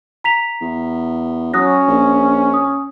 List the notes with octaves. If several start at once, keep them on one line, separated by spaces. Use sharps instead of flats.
A#5 B6 F7
E2
F#3 C#4 D#6 F#6 A#6
A#1
D#6